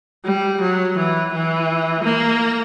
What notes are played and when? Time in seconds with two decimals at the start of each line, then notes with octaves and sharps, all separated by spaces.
0.25 G3
0.61 F#3
0.97 E3
1.33 E3
2.04 A#3